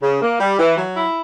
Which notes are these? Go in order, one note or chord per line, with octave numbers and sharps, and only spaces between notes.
C#3
A#3
G3
E3
F#3
E4